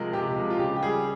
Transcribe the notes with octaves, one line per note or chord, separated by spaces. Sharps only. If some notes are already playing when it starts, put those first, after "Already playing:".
Already playing: C3 F3 G#3 A#4
C3 G4
F3 G#3
F4
C#3 G4
G4
G3 G#4